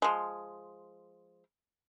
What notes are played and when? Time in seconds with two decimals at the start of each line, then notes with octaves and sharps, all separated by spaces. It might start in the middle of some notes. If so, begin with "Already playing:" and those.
0.02 F3 G#3